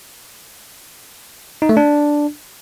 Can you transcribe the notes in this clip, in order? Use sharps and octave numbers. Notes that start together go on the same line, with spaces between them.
D#4
A3
D4